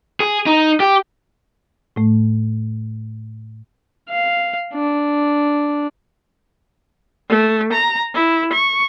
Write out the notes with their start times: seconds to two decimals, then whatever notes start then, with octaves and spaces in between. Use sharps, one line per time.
0.20 G#4
0.46 D#4
0.80 G4
1.96 A2 A3
4.09 F5
4.74 D4
7.29 A3
7.72 A#5
8.14 E4
8.53 C#6